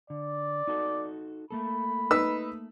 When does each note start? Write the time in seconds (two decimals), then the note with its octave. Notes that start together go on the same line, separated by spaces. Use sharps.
0.10 D3 D5
0.67 D#4 F#4 A4
1.51 A3 A#3 A4 B5
2.11 D#4 B4 E6